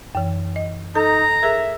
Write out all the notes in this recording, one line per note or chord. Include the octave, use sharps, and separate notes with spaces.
F#2 E3
D#5
D#4 A4 A#5 E6
G#4 A#4 E5